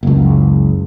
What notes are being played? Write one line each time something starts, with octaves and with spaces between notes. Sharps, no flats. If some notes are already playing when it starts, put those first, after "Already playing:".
F#1 C#2